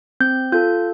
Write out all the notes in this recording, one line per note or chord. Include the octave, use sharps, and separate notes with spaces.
C4 G6
F4 A4 G6